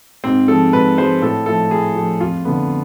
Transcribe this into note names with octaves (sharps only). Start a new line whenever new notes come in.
G#2 C4
F3 G#3 A4
G#2 B4
F3 G#3 C5
A2 A4
F3 A3 A4
A2 G#4
F3 A3
F2 F4
D3 A3 B3